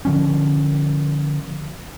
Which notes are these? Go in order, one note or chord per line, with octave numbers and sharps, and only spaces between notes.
D3 F3 C#4